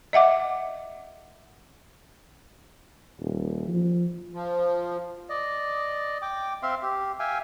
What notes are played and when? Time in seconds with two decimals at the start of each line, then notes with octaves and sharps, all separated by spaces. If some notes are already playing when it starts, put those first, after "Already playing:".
0.13 D#5 E5 F#5 D6
3.20 D#1
3.68 F3
4.34 F3
5.29 D5 D#5
6.22 G5 D6
6.63 C4 E5 F5 C6
6.82 G4
7.20 E5 F5 G5 G#5